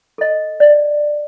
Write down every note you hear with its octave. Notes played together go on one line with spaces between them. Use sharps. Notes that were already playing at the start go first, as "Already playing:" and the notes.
A4 D#5
D5